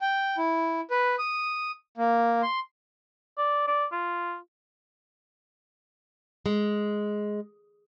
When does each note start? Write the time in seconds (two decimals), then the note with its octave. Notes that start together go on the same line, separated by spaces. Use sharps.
0.01 G5
0.37 E4
0.90 B4
1.19 D#6
1.98 A#3
2.42 C6
3.38 D5
3.67 D5
3.92 F4
6.46 G#3